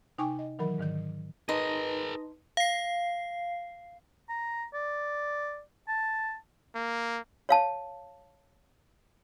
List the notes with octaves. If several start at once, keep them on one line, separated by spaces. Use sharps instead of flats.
C3 D#4 G5 G#5 C#6 D6
D#5
D#3 E3 F#3 A#4 B5
G#2 D3 D#3 G6
D#4 G#4 A#4 B4 D#5 A5 C6
F5 C7
A#5
D5
A5
A#3
C#5 F5 A5